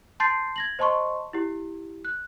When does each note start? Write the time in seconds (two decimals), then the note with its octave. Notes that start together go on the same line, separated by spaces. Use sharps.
0.20 A5 C6 G6 A6 C7
0.56 G#6 A#6 F#7
0.79 C5 D#5 A5 C6 C#6
1.33 E4 G4
2.05 F#6